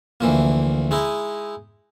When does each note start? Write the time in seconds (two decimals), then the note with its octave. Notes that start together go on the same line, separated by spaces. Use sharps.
0.21 D2 E3 F3 A#3
0.91 G#3 D#4 E4